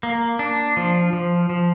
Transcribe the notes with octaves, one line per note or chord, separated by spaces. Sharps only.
A#3
D4
F3
F3
F3